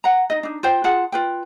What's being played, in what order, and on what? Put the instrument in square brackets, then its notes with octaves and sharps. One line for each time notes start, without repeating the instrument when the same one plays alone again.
[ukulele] F#5 A#5
D#4 D#5
D4 D#4
F4 C5 G5
F4 G#4 F#5 A5
F4 B4 G5